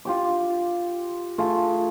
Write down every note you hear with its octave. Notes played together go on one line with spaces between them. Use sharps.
F4 G4 D6
A3 F4 G#4